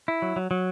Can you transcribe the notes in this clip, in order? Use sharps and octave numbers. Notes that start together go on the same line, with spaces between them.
E4
F#3
F#3
F#3